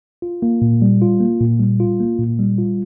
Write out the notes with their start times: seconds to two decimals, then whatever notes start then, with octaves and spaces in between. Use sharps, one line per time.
0.22 F4
0.42 A#3
0.62 A#2
0.82 G3
1.02 F4
1.20 A#3
1.41 A#2
1.60 G3
1.80 F4
2.00 A#3
2.19 A#2
2.39 G3
2.58 F4